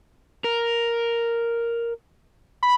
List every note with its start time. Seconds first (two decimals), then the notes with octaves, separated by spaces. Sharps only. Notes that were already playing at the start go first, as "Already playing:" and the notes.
0.44 A#4
2.63 B5